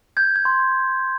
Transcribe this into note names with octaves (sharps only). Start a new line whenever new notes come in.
G6 G#6
G#6
C6